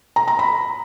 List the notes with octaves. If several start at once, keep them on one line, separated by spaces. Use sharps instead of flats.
A#5
A#5
B5